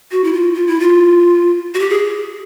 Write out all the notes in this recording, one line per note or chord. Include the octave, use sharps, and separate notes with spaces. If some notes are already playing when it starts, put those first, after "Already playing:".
F#4
E4
F4
F4
E4
F4
F#4
G4
G#4